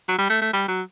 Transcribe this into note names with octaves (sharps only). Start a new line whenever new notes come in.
F#3
G3
A3
A3
G3
F#3